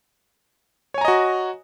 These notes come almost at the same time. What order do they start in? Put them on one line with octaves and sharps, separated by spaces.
C#5 G#5 A#5 D#5 F#4